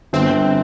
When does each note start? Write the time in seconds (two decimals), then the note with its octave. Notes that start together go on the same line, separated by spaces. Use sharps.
0.13 G1 C4